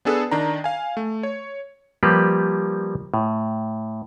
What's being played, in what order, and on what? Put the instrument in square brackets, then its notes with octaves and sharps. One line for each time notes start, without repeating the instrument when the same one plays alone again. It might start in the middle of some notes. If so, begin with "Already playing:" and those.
[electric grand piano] B3 D4 G#4 A4 B4
D#3 D4 A#5
F5 G#5
A3
C#5
[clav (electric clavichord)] F3 G3 A#3 G4 B4
A2